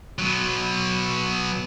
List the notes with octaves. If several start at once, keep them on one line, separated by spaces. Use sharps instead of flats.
B2 F#3